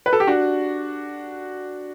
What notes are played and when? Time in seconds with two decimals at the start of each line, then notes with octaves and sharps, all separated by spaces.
0.06 B4
0.13 A4
0.20 G4
0.27 D4 F#4